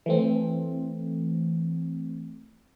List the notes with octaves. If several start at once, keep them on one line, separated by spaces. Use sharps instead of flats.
E3 A3 C4